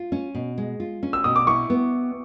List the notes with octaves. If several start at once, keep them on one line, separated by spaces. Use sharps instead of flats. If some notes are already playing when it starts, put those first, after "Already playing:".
Already playing: F4
C#4
B2
G#3
F4
C#4
E6
B2 D#6
D6
E4 C#6
B3